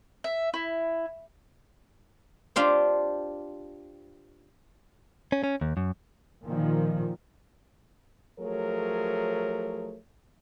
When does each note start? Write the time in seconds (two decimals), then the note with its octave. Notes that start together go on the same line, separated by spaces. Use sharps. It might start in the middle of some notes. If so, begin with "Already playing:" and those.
0.24 E5
0.54 E4
2.56 D4 F4 G4 C5
5.32 C#4
5.44 C#4
5.61 D#2
5.77 F#2
6.45 A#2 D#3 F3
8.39 F3 F#3 A3 G#4 A#4 C#5